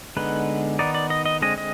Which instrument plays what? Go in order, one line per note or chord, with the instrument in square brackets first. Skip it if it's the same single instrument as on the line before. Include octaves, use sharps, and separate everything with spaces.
[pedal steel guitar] D3 G#3 B3 D#4 B4
D#3 B3 D#4 D5
D5
D#5
D#5
D3 G#3 C4 D#5
D#5